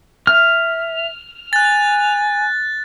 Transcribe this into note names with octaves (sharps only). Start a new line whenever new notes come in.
E5 F6
G#5 F#6 A6